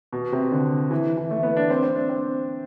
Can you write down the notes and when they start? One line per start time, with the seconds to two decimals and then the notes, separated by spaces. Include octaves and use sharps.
0.13 B2
0.32 C3
0.52 D3
0.91 E3
1.17 E3
1.31 A3
1.43 B3
1.57 D4
1.70 C4
1.83 C4
1.95 D4
2.09 C4